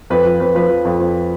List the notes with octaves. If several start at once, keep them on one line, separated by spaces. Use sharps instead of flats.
F2 B4
F3
F2 B4
F3 B4
F3
F2
F2